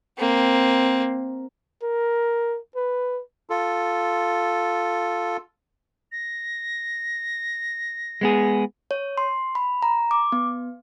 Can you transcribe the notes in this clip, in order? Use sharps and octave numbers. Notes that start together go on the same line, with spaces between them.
A#3 C4
A#4
B4
F4 A4
A#6
G#3 B3 G#4
C#5
C6
B5
A#5
D6
B3